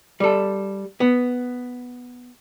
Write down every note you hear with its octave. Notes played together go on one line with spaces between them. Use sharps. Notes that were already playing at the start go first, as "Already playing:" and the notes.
G3 A4
B3